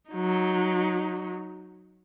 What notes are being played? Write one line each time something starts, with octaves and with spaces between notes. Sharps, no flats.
F#3 D#4